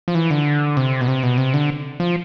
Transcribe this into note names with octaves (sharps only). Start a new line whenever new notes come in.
F3
E3
D3
C3
B2
C3
B2
C3
D3
F3